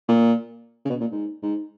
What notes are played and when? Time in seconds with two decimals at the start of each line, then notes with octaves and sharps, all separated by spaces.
0.08 A#2
0.85 C#3
0.90 B2
1.01 A#2
1.12 G#2
1.43 G#2